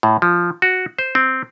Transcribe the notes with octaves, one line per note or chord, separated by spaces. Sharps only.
A2
F3
F#4
C5
C4